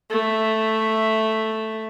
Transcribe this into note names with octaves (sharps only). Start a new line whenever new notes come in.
A3 E5